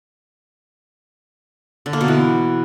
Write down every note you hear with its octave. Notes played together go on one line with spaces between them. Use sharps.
D3
A#3
B2
E3